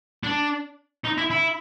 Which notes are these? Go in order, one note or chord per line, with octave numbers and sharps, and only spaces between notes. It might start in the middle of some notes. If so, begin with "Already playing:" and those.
D4
D#4
E4
E4